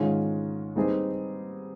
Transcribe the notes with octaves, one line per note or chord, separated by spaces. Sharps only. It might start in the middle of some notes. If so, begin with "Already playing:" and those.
Already playing: G#2 D#3 G#3 C#4 F4
G3 C4 D#4 G#4 B4